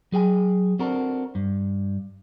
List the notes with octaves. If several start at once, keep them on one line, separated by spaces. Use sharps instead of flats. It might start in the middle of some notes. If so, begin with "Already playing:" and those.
F#3 G#4 G5 G#5
C4 D4 F#4 A4 A#4
G2